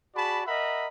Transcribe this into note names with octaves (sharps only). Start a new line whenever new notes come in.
F#4 G#4 D5 A5 B5
A#4 D#5 E5 F#5 A#5 B5